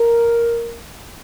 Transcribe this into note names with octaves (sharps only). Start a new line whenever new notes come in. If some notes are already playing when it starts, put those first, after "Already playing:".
Already playing: A#4